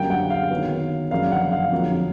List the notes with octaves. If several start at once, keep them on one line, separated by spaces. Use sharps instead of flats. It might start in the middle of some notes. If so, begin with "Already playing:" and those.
Already playing: F#2 D3 G3 A#3 G5
F#5
F5
D#3 F#3 B3
F#2 D3 F3 A#3 D4 F5
F#5
F5
F2 D3 F#3 A#3